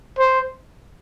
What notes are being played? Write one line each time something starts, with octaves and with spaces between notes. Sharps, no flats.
C5